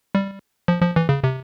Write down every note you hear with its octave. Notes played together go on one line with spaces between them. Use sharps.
G3
F3
F3
E3
C#3
C3